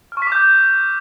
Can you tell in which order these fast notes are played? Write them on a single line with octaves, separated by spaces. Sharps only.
F6 C#6 B6 D6 G6